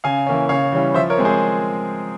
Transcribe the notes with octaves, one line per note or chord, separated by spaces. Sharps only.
C#3 F5 G#5
E3 A#3 C#4
C#3 C#5 F5
E3 G3 C#4
F3 C5 E5
A#4 C#5
G#3 C4
G#4 C5